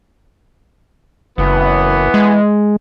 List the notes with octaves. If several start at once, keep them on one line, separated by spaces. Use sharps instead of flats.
F#1 E3 B3
G#3